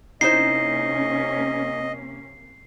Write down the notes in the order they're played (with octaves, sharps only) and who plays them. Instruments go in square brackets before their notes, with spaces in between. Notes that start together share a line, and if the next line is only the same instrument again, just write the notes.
[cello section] C3 A#3 C#4 [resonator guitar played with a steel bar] D#4 E4 C5 [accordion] D#5 [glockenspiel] C7